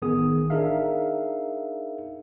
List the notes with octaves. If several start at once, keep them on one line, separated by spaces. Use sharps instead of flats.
A1 D#3 B3 G#4 D#6
D4 D#4 G#4 A#4 E5 F5